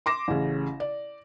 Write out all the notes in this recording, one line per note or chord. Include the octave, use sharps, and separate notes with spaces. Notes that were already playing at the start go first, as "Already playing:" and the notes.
C6 D6 A#6 E7
A1 C#3
D5